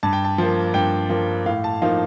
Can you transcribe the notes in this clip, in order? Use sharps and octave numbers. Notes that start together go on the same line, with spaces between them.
G2 A5
G5
A5
F3 A#3
G2 G5
F3 A#3
A2 F5
A5
F3 A#3 D#4 F5